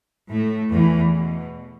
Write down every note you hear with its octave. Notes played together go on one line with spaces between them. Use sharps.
A2 A3
E2 E3
B2